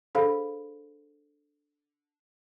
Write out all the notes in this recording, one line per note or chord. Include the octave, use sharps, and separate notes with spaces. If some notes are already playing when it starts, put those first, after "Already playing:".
D4 G#4 A4 C5 F5 B5